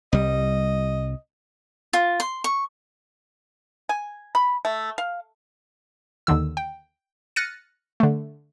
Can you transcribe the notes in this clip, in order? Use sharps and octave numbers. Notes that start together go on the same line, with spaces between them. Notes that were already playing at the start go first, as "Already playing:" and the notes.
C2 G3 D#5
F4
C6
C#6
G#5
B5
A3
F5
D#2 D3 D#3 E6
G5
F6 F#6 A6 A#6 C#7 D#7
D3 A3